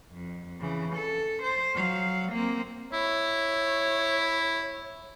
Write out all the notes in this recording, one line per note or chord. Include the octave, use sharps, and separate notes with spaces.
F2
C#3 E3
A4
C5
F#3 F5
A#3 C4
E4 C#5